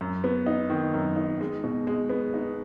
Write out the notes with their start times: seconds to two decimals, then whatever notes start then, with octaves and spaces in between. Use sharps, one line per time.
0.01 F#2
0.24 B3
0.47 D#4
0.70 D#3
0.94 F#2
1.16 D#4
1.41 G#3
1.64 B2
1.87 G#3
2.10 B3
2.34 D#4